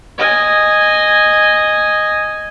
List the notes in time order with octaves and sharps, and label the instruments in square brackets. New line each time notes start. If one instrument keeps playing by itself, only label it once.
[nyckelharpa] D#5 G#5